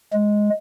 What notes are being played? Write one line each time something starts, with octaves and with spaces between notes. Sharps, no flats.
G#3